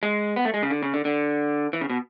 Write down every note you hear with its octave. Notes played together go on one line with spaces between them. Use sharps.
G#3
B3
A3
G#3
C#3
D3
C#3
D3
D3
E3
C#3
B2